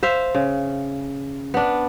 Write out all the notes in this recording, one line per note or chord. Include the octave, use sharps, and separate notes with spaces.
C5 E5 F5
C#3
B3 D4